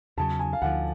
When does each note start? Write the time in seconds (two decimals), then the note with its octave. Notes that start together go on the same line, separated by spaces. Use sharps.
0.17 E2 C#3 F#3 A5
0.39 G#5
0.53 F5
0.62 D2 D3 F3 F#5